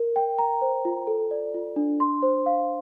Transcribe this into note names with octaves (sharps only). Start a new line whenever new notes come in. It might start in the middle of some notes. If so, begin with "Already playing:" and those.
Already playing: A#4
G5
A#5
C5
F4
A4
D5
F4
D4
C6
C5
F5